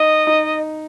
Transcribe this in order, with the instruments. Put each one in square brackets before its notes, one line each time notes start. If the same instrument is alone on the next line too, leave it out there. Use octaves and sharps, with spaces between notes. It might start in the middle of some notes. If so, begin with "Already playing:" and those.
Already playing: [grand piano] D#4 [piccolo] D#5
[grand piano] D#4